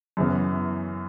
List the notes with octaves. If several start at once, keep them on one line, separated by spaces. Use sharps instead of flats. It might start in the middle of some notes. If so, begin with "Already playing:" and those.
F#2 C#3 E3 B3